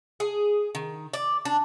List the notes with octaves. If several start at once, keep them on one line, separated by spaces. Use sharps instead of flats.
G#4
D#3
D5
D4